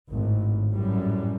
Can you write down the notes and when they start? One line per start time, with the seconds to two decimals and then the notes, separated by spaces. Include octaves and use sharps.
0.10 G#1 A2
0.72 F#2 A2 G3